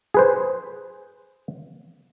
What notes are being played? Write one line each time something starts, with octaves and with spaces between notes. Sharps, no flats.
G#4 B4 C5